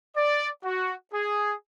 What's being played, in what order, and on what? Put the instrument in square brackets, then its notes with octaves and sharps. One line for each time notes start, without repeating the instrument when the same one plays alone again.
[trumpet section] D5
F#4
G#4